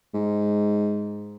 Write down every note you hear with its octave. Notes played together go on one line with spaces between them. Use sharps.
G#2